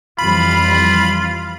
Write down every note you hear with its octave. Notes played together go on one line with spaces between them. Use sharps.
F2 E3 G3 F4 B5